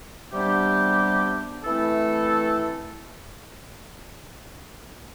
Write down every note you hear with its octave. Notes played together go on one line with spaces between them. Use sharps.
C3 G3 B3 D4 G4
E3 A3 C4 E4 A4